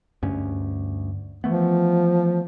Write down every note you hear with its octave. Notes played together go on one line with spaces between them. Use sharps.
D2 G2 C#4
E3 F3 A3 B3